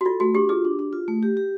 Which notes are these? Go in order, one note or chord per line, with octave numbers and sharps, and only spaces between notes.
F#4
F4 A4
A3 F#4
D4 G4
F4 G#4
D4
D4
F4
A3
G4
G4